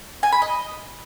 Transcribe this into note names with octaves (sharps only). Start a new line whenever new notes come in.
G#5
B5
D#5